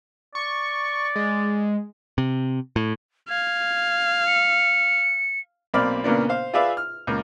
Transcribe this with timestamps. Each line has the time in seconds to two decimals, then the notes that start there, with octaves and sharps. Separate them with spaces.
0.35 D5 C#6
1.16 G#3
2.18 C3
2.76 A2
3.29 F5 G#6
4.27 C#7
5.74 B1 A#3 C4 D5 B5 F6
6.04 A#2 C#3 A#3 B3 D4
6.29 C5 F5
6.54 F4 G#4 B4 D5 E5 F5
6.77 F6
7.07 C#2 A#3